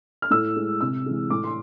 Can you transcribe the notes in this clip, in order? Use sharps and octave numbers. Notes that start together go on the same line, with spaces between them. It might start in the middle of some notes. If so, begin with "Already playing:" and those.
F6
A2 E6
G#3
C3 E6
E3 G#3
A2 D6
C6